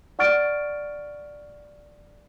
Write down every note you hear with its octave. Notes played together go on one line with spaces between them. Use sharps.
D5 F#5 C#6 F6 A6 D7